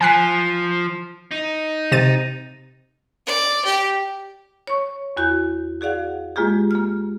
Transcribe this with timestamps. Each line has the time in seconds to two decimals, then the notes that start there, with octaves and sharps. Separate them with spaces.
0.01 F3 G#5 F#6 B6
1.31 D#4
1.92 C3 A6 D#7
3.27 D5
3.65 G4
4.67 C#5 C#6
5.17 E2 F#4 G6
5.81 F#4 G#4 D5 F5 F#5
6.36 G#3 A#3 F4 G4 G#4
6.71 A#3 F6